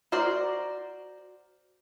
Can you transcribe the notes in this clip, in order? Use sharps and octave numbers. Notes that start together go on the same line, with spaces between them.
F#4 A#4 C5 D5